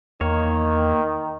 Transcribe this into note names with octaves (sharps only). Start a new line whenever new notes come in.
E2 D#3 A#3 C#5